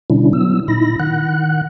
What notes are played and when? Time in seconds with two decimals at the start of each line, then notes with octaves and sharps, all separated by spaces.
0.10 B2 D3 G3 C#4 D4 E4
0.33 F#3 B3 E6
0.68 A#2 D#4 E4 B5 A#6
1.00 D#3 F#5 F#6